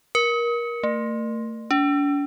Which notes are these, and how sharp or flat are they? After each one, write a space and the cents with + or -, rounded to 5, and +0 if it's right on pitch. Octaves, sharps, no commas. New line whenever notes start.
A#4 +25
A3 +35
D4 -45